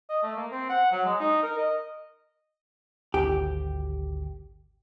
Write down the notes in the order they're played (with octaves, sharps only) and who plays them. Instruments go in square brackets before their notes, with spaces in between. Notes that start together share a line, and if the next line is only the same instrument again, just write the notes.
[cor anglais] D#5
A3
A#3
C4
F#5
F#3
G#3
D#4
A#4
D#5
[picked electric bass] G#1 D2 [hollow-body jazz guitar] G4